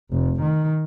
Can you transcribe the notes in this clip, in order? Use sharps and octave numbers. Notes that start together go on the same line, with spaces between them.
F1
D#3